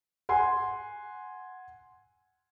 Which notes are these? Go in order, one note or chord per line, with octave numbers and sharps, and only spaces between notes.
F#5 G#5 C6